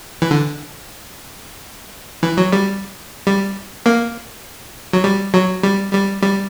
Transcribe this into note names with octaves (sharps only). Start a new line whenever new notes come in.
E3
D3
E3
F#3
G3
G3
A#3
F#3
G3
F#3
G3
G3
G3